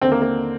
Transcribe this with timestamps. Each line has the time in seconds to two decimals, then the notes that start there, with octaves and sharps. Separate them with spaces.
0.01 D#2 D3 C4
0.12 A#3
0.22 A#3